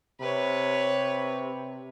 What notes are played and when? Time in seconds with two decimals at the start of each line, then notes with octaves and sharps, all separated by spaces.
0.21 C3 B4 C#5